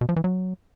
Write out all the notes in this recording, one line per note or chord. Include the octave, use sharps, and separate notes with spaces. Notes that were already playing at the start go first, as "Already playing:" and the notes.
B2
F3
E3
F#3